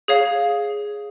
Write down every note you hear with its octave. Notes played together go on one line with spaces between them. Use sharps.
G#4 C#5 F5